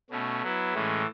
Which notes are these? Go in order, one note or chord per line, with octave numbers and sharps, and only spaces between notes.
B2 A3 C#4
F#3 B3 E4
A2 E3 G#3 C#4